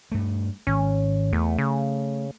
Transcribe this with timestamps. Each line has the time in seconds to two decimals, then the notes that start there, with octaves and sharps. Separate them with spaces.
0.12 G2 A3
0.67 G#1 C#4
1.33 E2 A3
1.58 C#3